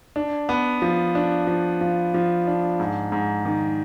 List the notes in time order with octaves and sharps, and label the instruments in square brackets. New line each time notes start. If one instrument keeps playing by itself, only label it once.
[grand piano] D4
B3
F3
D4
F3
F3
F3
D4
G#2
G#2
D#3